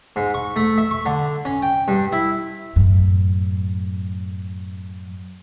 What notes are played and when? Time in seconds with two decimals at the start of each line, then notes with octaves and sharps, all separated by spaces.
0.16 G#2
0.34 C#6
0.56 A3
0.78 E5
0.91 C#6
1.06 D3
1.45 C#4
1.62 G5
1.88 G2
2.12 E4
2.76 F#2 A2